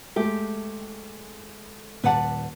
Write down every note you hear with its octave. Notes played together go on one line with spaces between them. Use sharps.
G#3 A3 G4
D#1 B4 D5 F#5 A5